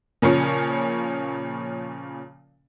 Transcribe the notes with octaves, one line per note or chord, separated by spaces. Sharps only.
A#2 C#3 F3 C#4